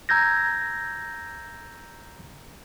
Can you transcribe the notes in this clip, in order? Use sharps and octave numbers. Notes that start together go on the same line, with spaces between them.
A#5 E6 G6 G#6 A#6